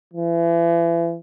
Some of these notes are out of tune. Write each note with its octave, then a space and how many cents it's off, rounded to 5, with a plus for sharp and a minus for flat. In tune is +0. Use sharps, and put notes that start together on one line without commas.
E3 +35